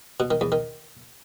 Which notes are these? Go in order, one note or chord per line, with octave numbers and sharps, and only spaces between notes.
B2
D#3
E2
D#3